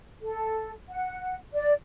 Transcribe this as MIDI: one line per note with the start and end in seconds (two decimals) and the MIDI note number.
0.22 0.71 69
0.89 1.35 78
1.53 1.72 74